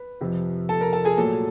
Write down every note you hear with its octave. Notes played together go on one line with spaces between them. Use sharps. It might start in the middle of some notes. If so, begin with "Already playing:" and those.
Already playing: B4
F2 C3 F3
A4 A5
A#4 A#5
A4 A5
G#4 G#5
A#2 F#3 A3 A4 A5